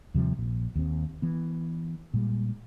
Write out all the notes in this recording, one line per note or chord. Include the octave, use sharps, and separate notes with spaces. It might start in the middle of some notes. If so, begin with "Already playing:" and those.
D#2 C3 F3 G3
A#1 A#2
D#2 C4
E3 B3
A#2 G3 G#3